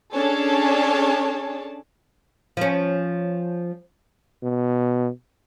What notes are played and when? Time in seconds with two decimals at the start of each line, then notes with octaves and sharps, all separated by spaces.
0.14 C#4 D4 G#4 A4 C#5 A5
2.57 F3 C#4
4.43 B2